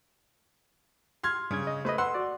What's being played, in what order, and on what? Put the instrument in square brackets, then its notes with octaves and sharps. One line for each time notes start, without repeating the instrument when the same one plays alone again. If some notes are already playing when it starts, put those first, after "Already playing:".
[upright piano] C6 F6 G#6
[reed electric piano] G2 G#6 [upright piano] C#3
[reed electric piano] D#5
[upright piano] A3 B4 [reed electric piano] C5 D#5
[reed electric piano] B4 F#5 E6 [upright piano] C6
[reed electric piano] F#4 D5